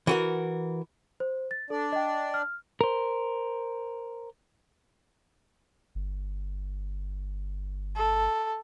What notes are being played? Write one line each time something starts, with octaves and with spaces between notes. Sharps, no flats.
E3 F#4 A#4
C5
A6
D4 A4 D5
D#5 G5
F6
A#4 C5
G1
A4